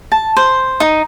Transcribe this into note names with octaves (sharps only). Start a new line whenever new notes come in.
A5
C5
D#4